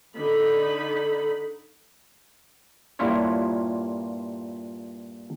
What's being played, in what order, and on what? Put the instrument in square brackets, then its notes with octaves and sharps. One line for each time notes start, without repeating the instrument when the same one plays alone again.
[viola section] D3 D#4 B5
[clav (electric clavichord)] G2 A#2 A#3 E4 F4 C#5